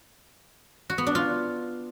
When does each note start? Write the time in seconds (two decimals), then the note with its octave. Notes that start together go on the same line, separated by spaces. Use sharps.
0.90 F#4
0.98 B3
1.07 D4
1.15 F4